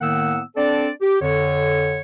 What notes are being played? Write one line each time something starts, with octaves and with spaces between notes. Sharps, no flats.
A2 D#3 A#3 B3 F#5 E6
C4 D4 A4 D5
G4
F2 D3 C#5